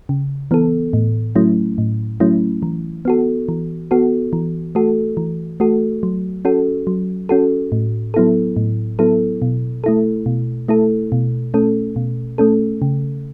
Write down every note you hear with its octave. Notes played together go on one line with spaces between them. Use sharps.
C#3
E3 B3 A4
A2
F#3 A3 C#4 E4
A2
F#3 A3 C#4 E4
E3
B3 F#4 A4
E3
B3 F#4 A4
E3
A3 F#4 A4
E3
A3 F#4 A4
F#3
C#4 F#4 A4
F#3
C#4 F#4 A4
A2
F#3 B3 E4 A4
A2
F#3 B3 E4 A4
B2
A3 E4 A4
B2
A3 E4 A4
B2
A3 C#4 A4
B2
A3 C#4 A4
C#3